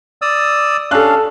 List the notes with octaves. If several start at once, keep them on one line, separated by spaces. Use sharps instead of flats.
D5 D#6 E6
C#4 D4 A4 F5 F#6